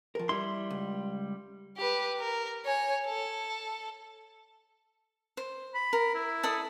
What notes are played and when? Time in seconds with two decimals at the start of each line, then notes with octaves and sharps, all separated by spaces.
0.15 F3 A#4
0.29 G3 E4 E5 C6
0.70 C#2
1.77 G4 B4
2.19 A#4
2.65 C#5 G#5
3.06 A4
5.37 C5
5.74 B5
5.93 A#4
6.14 E4
6.43 A4 D5 D#6